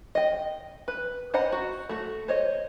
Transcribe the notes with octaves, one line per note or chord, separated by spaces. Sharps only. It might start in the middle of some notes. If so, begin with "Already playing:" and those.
D#5 G5
B4
C5 D#5 F#5 A#5 B5
F#4
A3 F#4
C5 C#5 D#5